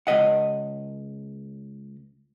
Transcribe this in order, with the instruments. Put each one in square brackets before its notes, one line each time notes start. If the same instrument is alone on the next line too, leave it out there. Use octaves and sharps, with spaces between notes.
[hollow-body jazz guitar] C#2 B2 D#5 F#5